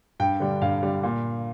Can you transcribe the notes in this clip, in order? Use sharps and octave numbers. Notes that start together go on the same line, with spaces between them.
G2 G5
D3 G3
G2 F5
D3 G3
A#2